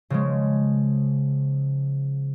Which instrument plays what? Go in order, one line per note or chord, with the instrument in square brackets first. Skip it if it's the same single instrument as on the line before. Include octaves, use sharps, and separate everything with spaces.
[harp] C#3 F3 G#3